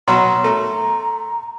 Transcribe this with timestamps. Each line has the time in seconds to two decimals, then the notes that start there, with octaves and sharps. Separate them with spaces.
0.08 B2 F#3 F#4 A#5 C6
0.44 A3